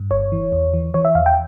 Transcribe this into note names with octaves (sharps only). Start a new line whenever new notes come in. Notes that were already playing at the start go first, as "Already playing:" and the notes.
Already playing: G2
G1 C#5
E3
E2
E3
E3 C#5
E5
E2 F5
G5